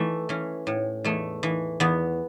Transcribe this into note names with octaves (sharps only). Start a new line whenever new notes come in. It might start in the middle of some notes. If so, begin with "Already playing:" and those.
Already playing: E3 A3
E3 C#4
A2
E2 A3
E3
E2 B3